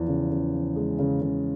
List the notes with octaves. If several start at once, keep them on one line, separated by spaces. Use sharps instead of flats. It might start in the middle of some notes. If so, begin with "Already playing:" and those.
Already playing: E2 F3
C#3
C#3
F3
G#3
C#3
C#3